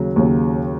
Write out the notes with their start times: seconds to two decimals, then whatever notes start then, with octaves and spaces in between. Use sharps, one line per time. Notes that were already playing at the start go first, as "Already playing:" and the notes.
Already playing: D#2 C#3 F#3
0.16 D#2 C#3 F#3